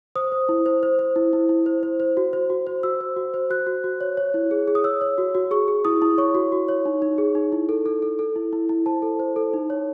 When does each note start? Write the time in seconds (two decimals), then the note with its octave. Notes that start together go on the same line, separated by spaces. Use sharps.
0.15 C5 D#6
0.32 C5
0.49 E4
0.66 C5
0.83 C5
0.99 C5
1.16 E4
1.33 E4
1.49 E4
1.66 C5
1.83 C5
2.00 C5
2.17 F#4
2.33 C5
2.50 F#4
2.67 C5
2.83 F#4 E6
3.00 C5
3.16 F#4
3.34 C5
3.50 F#4 F#6
3.67 F#4
3.84 F#4
4.01 C#5
4.17 C#5
4.34 E4
4.51 G#4
4.68 G#4
4.75 D#6
4.84 C#5 E6
5.01 C#5
5.18 F#4
5.35 F#4
5.51 G#4 C#6
5.68 G#4
5.85 E4 D#6
6.02 E4
6.18 C#5 C#6
6.35 F#4
6.52 F#4
6.68 C#5
6.86 D#4
7.02 D#4
7.18 G#4
7.35 D#4
7.52 E4
7.69 A4
7.86 A4
8.02 A4
8.19 A4
8.36 E4
8.53 E4
8.69 E4
8.86 C5 A5
9.02 A4
9.20 C5
9.36 A4
9.53 D#4
9.70 C#5